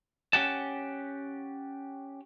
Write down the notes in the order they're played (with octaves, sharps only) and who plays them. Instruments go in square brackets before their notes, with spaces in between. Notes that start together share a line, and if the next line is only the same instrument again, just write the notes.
[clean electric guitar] C#4 G4 F#5 A5